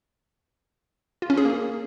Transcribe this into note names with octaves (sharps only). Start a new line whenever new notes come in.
F4
C#4
G#4
A#3